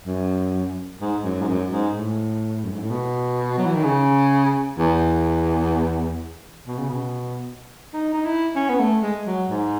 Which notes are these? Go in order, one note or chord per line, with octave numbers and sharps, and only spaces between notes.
F#2
G#2
F#2
G#2
F#2
G#2
A2
F#2
G#2
A2
B2
F#3
E3
D#3
C#3
E2
B2
C#3
B2
D#4
D#4
E4
C#4
B3
A3
G#3
F#3
G#2